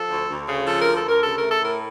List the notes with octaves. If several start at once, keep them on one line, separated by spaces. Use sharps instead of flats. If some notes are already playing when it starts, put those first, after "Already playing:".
Already playing: F3 A4
D2
D2
C#3
F3 A4
D2 A#4
A4
D2 A#4
C#3 A4
A#4
A3
A4
A2 A#4